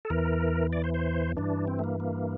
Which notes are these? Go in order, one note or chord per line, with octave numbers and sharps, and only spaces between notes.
A4
E2 E3 A#4
D5
C5
C5
G2 E3 D4
C4
A3
A#3
A#3